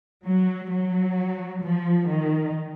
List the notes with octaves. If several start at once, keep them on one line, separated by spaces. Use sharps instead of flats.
F#3
F#3
F3
D#3